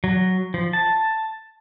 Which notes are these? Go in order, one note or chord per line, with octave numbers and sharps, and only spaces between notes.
F#3
F3
A5